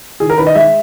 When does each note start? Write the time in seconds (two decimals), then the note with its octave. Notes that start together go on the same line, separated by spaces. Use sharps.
0.20 D#3 G#4
0.30 A#4
0.38 D#3 B4
0.47 D#5
0.55 G#3 E5